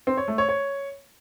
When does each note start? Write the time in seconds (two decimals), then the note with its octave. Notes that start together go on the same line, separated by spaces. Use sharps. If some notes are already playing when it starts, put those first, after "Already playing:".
0.07 C4
0.17 C#5
0.28 A3
0.38 C#5
0.49 C#5